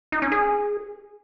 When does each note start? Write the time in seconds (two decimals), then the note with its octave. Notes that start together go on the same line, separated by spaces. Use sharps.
0.12 D#4
0.22 C#4
0.32 G#4